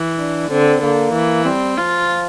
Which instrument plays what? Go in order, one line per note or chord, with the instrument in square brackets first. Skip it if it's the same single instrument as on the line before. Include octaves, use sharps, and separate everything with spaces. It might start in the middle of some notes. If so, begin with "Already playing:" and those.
Already playing: [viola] E3
[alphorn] D4
[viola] D3 [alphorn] C4
[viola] D3 [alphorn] A#3
[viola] E3
[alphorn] G3 [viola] C4
[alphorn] F3 [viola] F4